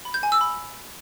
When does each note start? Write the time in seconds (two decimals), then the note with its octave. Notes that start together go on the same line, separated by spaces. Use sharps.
0.05 B5
0.14 G6
0.23 G#5
0.32 E6
0.41 B5